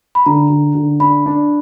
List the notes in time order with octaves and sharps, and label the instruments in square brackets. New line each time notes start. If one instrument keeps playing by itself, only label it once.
[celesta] B5
[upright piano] D3 [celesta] A#5
[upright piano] D3
D3
[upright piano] D4 [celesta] B5
[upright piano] D4